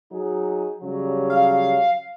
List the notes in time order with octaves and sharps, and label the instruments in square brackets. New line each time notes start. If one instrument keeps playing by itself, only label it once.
[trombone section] F#3 D#4 G#4
C#3 F#3 G3
[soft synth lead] F5